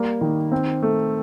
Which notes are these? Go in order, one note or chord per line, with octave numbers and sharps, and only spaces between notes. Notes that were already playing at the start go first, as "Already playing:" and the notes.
Already playing: G3 A#3
D#3
C4
A3